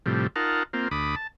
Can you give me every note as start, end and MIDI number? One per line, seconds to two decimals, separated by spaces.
0.06 0.27 45
0.06 0.27 48
0.06 0.27 53
0.06 0.27 55
0.36 0.63 63
0.36 0.63 65
0.36 0.63 70
0.36 0.63 78
0.36 0.63 81
0.73 0.88 58
0.73 0.88 60
0.73 0.88 65
0.91 1.15 38
0.91 1.15 83
0.91 1.15 86
0.91 1.15 87
1.16 1.27 81